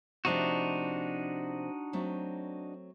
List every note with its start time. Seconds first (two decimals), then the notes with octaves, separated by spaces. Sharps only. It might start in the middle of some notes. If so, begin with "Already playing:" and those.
0.25 C3 F3 A3 D4 D#4 F#4
1.93 F#3 A3 C4